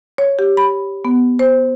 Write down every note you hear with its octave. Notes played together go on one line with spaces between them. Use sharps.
C#5
G4
B5
B3
C5